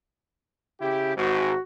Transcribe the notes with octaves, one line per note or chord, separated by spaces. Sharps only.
C#3 E4 G4
G#1 G#2 F#4